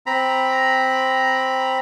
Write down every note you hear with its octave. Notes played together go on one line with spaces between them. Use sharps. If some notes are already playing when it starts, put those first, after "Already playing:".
C4 A#5 B5